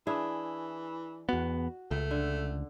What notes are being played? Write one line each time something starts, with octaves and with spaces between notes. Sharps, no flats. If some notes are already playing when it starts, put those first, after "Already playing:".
E3 D4 E4 G#4
E2 B3 F#4
C#2 A3
D3